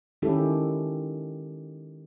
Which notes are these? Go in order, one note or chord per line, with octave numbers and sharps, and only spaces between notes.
D#3 G#3 C#4 E4 G4 A4